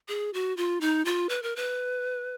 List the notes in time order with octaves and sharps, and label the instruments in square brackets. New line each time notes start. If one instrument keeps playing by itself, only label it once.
[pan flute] G#4
F#4
F4
D#4
F4
B4
A#4
B4